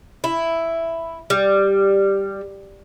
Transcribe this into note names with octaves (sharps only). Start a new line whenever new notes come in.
E4
G3